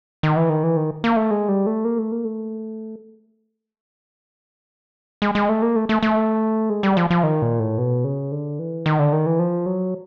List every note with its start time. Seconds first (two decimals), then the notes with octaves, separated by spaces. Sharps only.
0.23 D#3
0.36 E3
0.49 D#3
0.63 E3
0.77 D#3
1.04 A#3
1.16 A3
1.31 G#3
1.49 G3
1.66 A3
1.85 A#3
1.99 A3
2.12 A#3
2.25 A3
5.22 G#3
5.35 G#3
5.49 A3
5.62 A#3
5.76 A3
5.89 A3
6.03 A3
6.70 G#3
6.83 G3
6.97 F3
7.10 F3
7.23 D#3
7.42 A#2
7.59 A2
7.78 B2
8.04 C#3
8.32 D3
8.59 E3
8.86 D#3
8.99 D3
9.13 D#3
9.26 E3
9.39 F3
9.66 F#3